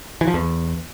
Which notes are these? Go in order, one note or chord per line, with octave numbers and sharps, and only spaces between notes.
E3
F3
E2